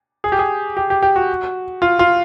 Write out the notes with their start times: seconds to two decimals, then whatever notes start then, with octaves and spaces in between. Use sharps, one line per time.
0.24 G#4
0.32 G4
0.39 G#4
0.77 G4
0.90 G4
1.02 G4
1.16 F#4
1.82 F4
1.99 F4